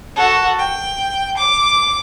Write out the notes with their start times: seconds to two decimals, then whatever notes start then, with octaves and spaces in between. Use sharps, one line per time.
0.16 F#4 A4
0.59 G5
1.37 D6